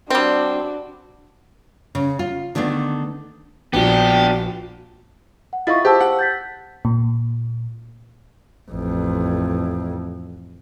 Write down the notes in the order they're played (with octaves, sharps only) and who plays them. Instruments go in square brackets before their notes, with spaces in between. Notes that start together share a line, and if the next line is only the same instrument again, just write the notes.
[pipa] G3 C4 [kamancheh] D4 F#4
[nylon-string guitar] C#3
F4
D3 D#3 A3 B3 D4
[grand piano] A#1 [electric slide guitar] B3 D4 [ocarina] F#4 [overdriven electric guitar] G4
[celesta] F#5
[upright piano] E4 F4 D#5 [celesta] C#6 A6
[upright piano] G4 [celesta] C5 A5 E6
[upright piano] F#5
[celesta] G6 A6 B6
[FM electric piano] A#2
[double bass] A1 F2